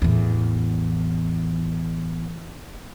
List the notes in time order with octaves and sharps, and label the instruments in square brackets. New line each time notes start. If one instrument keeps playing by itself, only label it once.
[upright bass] A1 E2